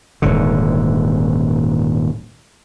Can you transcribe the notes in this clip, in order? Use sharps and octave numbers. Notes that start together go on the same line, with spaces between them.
D#1 G#2 D3